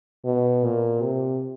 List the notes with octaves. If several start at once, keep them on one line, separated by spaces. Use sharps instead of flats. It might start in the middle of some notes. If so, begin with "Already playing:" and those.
B2
A#2
C3